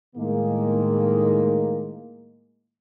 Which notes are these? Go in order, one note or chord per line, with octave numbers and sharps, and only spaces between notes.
A2 D#3 G#3 A#3